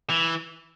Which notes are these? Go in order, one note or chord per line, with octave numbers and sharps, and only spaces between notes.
E3